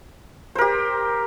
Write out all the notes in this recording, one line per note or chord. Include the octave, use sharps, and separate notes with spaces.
G4 A#4 C5